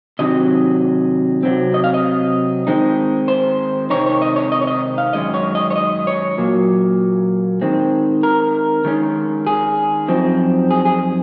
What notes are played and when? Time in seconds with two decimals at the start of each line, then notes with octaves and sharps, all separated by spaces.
0.19 C3 D#3 F#3 C4 D#4 D#5
1.43 C3 F#3 C4
1.74 D#5
1.84 F5
1.94 D#5
2.67 D#3 G#3 C4 D#4
3.28 C5
3.90 C3 D#3 G#3 C4 D#4 C#5
4.06 C#5
4.22 D#5
4.36 C#5
4.52 D#5
4.62 C#5
4.67 D#5
4.98 F5
5.13 F#2 D#3 G#3 C#4 D#5
5.34 C#5
5.55 D#5
5.70 C#5
5.76 D#5
6.07 C#5
6.38 A#2 F#3 A#3
7.62 D#3 G#3 C4
8.23 A#4
8.85 D#3 G#3 C#4
9.47 G#4
10.08 F#2 F3 C4 D#4
10.71 G#4
10.85 G#4